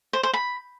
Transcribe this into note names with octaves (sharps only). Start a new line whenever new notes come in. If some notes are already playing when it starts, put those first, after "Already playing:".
C5
C5
B5